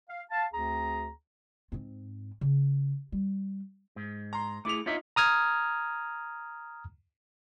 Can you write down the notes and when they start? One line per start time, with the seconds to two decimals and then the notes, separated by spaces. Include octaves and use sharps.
0.08 F5
0.31 F5 A5
0.52 D2 C4 G#4 A#5
1.72 G#2 C4
2.41 C#3
3.12 G3
3.96 G#2
4.33 A#5 C6
4.65 A3 E4 G#4 D6 F7
4.86 B3 D#4 F4 C#5 E5
5.16 A#5 D#6 F6 G#6